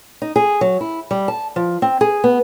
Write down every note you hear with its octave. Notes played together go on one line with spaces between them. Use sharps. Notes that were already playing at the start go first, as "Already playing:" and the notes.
D#4
G#4
F#3
E4
G3
A5
F3
C4
G#4
B3